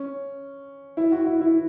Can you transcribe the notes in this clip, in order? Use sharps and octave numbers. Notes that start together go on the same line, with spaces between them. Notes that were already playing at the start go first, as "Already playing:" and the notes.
Already playing: C#4
E4
F#4
E4
E4